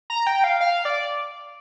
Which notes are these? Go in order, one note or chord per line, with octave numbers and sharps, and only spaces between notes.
A#5
G5
F5
F5
D5